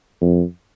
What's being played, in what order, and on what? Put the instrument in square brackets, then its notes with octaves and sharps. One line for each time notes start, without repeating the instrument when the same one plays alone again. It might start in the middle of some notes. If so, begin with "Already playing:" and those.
[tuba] F2